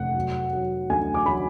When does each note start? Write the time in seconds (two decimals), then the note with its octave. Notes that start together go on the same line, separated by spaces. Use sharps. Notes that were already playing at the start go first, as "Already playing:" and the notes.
Already playing: F1 F#5
0.15 F#3
0.53 F#3
0.89 D2 G#5
1.14 D6
1.26 F#3 B5